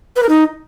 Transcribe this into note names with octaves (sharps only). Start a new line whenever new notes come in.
B4
A#4
D#4